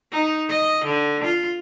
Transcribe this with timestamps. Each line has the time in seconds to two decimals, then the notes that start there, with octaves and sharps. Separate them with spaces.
0.12 D#4
0.49 D#5
0.85 D3
1.24 F4